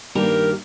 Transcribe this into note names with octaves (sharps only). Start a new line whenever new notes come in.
G2 D#3 A#3 G4 A#4